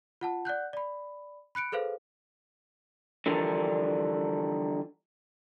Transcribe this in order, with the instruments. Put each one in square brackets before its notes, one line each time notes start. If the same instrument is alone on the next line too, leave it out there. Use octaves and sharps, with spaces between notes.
[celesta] F4 F#5 A5
D5 F#5 F#6 G6
D5 B5
B5 F#6 C#7 D7
G#4 A4 B4 C5 F5
[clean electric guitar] D3 E3 F3 G3 D4 A#4